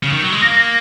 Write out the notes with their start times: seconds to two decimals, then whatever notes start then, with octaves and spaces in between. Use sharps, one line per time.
0.03 C#3
0.13 D#3
0.22 F#3
0.32 G#3
0.42 A#3 A#6
0.56 A#6